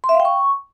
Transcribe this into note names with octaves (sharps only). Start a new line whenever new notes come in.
C6
E5
F5
G5
C#6